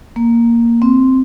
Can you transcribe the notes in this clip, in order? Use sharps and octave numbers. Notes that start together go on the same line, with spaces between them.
A#3
C4